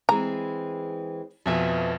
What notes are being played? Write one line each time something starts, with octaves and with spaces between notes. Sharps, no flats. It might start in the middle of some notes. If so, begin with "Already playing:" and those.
E3 G#3 C4 A#5
F2 B2 F3 B4 E5 G#5